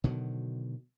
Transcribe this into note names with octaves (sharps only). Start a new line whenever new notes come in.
B2 D3 D#3 F#3